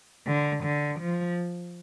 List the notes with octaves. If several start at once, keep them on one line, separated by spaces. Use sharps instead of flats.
D3
D3
F3